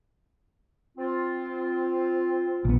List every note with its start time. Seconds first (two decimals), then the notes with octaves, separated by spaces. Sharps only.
0.98 C4 F4
2.65 A#1 B3